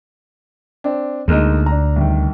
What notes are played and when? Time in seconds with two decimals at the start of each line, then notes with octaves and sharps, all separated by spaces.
0.84 C4 D4
1.28 D2 G#3 A#3 D#4
1.66 D4 A#5
1.96 C2 D#3